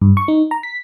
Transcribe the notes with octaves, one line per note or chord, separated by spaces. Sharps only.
G2
C#6
D#4
A#5
B6